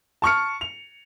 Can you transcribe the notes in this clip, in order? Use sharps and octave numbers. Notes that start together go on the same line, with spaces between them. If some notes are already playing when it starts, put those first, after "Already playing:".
A5 C#6 F6 C#7
F7